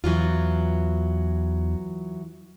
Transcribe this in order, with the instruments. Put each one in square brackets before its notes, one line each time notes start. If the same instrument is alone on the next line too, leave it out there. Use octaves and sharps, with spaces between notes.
[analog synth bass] E2 [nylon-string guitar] E3 F#3 F4